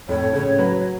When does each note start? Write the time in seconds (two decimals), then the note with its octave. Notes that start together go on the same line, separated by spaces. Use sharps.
0.09 F2 A2 C#5
0.33 A2 C#3 C#5
0.58 F#3 F#4 B4